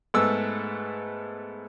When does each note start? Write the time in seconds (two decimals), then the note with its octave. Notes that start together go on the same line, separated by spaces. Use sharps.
0.14 G#2 A3 B3 E6